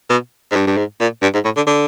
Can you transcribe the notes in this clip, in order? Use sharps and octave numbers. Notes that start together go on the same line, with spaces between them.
B2
G#2
G2
G2
G#2
A#2
G2
G#2
A2
D3
D3